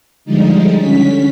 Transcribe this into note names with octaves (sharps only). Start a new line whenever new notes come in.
D3 F3 G3 G#3 D#4
D3 C#4 B6